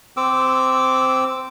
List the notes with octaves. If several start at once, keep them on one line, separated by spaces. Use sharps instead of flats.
C4 D6 E6